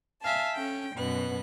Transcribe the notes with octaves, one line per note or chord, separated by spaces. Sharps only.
E5 F5 G#5 A5
C#4 A4 G5
F#2 B2 B3 F#6